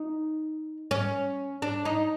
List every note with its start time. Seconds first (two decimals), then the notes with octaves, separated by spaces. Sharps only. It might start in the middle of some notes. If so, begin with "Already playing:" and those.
Already playing: D#4
0.91 C#4
1.62 D4
1.85 D#4